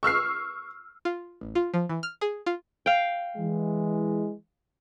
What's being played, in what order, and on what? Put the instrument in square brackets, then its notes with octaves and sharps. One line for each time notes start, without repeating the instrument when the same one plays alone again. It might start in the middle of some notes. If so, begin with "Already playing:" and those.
[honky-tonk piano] C#6 E6 F6 C7
[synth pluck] F4
A1
F4
F3
E3
F6
G#4
F4
[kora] F5 G5
[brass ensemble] E3 G#3